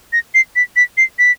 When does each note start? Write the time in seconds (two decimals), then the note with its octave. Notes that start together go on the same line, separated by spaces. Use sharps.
0.13 A#6
0.34 C7
0.56 B6
0.76 B6
0.97 C7
1.19 B6